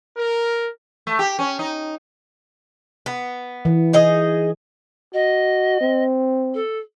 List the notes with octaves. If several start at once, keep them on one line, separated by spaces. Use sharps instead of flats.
A#4
A3
G4
C#4
D#4
B3
E3
D#4 G#4 D#5
F#4 D#5
C4
A4